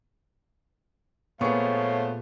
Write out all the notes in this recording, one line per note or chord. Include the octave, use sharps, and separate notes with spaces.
A#2 A3 B3 G#4 C5 C#5 F5 C#6